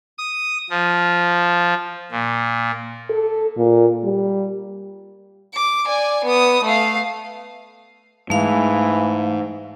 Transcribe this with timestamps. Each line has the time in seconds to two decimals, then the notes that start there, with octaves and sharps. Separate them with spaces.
0.18 D#6
0.70 F3
2.11 A#2
3.10 A4
3.57 A#2
4.04 G3
5.54 D6
5.86 D5 G#5
6.24 B3 D#6
6.64 A3 F5
8.30 G#2 E3 A3 F5